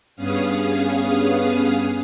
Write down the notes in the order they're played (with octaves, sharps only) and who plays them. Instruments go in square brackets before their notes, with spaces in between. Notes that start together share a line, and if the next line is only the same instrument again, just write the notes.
[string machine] G2 B3 C#4 G#4 F5 D#6